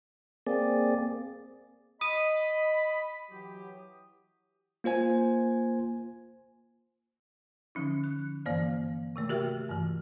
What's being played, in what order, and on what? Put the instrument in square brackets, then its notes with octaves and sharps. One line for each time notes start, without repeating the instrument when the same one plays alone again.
[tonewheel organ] A#3 C4 G#4 D5
[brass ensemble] D#5 [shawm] B5 [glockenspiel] D#6 D#7
[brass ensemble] E3 F#3 G4
[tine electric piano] A#3 F4 C5 G#5
[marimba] D3 F3 C#4 D#4
F#6
G2 E3 A#3 C5 D5 F5
C3 D#3 A3
F#4 G4 A#4 E5 G5 F6
G2 E3